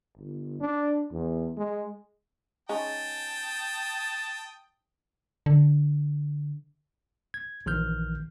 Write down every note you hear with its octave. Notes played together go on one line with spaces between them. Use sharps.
G1
D4
E2
G#3
G#3 C#4 D#4 G5 A5 D#6
D3
G#6
A#1 D#3 E3 F6 G6